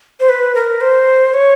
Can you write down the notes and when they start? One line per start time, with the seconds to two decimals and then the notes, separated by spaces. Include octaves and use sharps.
0.20 C5
0.29 B4
0.55 A#4
0.81 C5
1.34 C#5